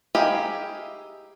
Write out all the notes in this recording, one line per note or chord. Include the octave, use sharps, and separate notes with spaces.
D#4 E4 G4 G#4 F5